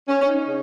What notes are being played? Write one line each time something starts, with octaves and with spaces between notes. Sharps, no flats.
C#4
C#4
D#4
C#3